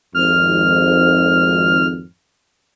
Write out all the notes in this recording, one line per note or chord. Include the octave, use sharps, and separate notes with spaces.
G#1 F2 F6